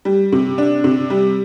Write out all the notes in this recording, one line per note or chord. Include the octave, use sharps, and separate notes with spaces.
G3
C3
D4
C3
G3